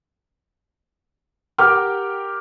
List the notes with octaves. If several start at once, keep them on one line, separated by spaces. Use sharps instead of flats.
G4 A#4 F#5 G5 D6 F6